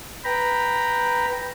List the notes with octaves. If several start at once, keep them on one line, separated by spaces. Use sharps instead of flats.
B4 G5 A#5 B5